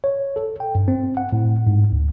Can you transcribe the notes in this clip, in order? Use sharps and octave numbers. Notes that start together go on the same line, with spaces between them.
C#5
A4
G5
G2
C4
F#5
A2
G#2
D2